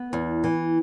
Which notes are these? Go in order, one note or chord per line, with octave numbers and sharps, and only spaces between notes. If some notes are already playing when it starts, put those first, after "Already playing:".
Already playing: B3
E2
E3